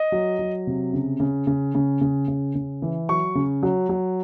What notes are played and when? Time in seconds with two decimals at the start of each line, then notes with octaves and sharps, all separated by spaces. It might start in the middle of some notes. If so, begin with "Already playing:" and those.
Already playing: D#5
0.12 F#3
0.39 F#3
0.67 C3
0.93 C#3
1.20 C#3
1.47 C#3
1.75 C#3
2.01 C#3
2.28 C#3
2.55 C#3
2.82 E3
3.09 F#3 C#6
3.35 C#3
3.63 F#3
3.89 F#3